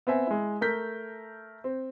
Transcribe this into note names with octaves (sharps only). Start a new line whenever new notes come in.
B3 C4 E5 G#5
G#3 E4
A3 A#4 G6 B6
C4